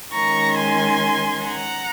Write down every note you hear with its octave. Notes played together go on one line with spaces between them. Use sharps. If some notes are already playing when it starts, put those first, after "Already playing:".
D#3 G#3 C#4 A#5 C#6
G#5 C6
F#5 A#5